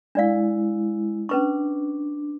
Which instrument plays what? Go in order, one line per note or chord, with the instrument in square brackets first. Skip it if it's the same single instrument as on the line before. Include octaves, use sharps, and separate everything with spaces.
[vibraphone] G#3 E4 [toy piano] D4 D5 F5
[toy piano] C#4 B4 C#6 [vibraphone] D4